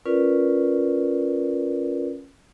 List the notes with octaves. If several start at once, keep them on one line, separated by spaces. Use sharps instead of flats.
C#4 F4 A#4 B4 D5